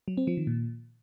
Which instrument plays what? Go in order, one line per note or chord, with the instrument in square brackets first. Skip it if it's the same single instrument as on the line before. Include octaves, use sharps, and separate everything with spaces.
[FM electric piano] F#3
C4
F3
D#3
A#2